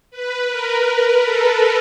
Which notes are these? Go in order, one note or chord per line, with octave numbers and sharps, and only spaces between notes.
B4
A#4
A#4
A4